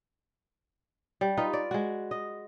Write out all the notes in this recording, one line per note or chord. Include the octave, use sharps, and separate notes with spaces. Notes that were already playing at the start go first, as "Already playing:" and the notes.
G3
D#4 F4 B4
D5
G#3 F#4
D#5